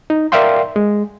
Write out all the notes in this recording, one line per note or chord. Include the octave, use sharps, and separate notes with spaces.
D#4
A#4 D5 E5 F5 G5 C6
G#3